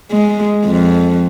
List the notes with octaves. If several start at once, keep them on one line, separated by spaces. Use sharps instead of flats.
G#3
F2